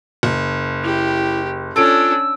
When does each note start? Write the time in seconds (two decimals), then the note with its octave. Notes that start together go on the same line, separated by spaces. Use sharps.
0.23 F#1
0.83 E4 G4
1.76 C#4 D4 F4 A4 E6 D7